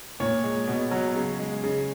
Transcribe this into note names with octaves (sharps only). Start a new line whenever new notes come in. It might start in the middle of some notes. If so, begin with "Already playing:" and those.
A#2 C#5
G#3
B2
F#3
C#3
G#3
C#3